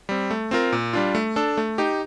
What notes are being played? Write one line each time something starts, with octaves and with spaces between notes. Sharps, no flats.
G3 C4
A3
C4 F4 A#4
A#2
G3 D4 F4
A3
D4 A4
A3
D#4 G4